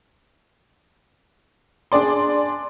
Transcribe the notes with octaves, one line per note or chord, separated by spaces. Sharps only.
D4 G#4 D5 C6